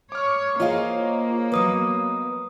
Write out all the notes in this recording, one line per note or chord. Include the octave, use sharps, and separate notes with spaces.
C#5 D6 F6
A#3 F4 G#4 C5 C#5 D#5 F5
F#3 B3 B4 D#6